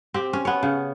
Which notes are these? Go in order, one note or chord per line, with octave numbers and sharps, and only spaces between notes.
C4 G4
C#4
B3 C#5
C#3